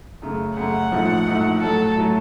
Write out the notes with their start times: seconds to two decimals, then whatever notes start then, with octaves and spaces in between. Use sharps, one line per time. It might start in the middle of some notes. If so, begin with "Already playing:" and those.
0.22 F#2 C#3 A3
0.57 F#2 C#3 A3 F#5
0.92 A#1 A2 F3 A3 D#4
1.27 A#1 A2 F3 A3 D#4
1.61 A2 F#3 A3 A4
1.96 A2 F#3 A3